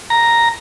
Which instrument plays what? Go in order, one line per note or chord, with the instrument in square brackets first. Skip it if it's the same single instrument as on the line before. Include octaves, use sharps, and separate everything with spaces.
[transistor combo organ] A#5